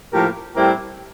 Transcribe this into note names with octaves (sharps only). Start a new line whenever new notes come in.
A2 F3 A#3 G4 A#4
A2 G3 C4 E4 G4 A#4